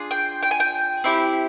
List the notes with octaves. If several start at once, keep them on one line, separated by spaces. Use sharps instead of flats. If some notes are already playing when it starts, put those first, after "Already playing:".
Already playing: D4 F4 G#4
G5
G5
G#5
G5
C4 E4 G4